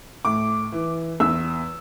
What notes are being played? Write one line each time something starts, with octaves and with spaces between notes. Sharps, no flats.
A2 D6
E3
E2 E6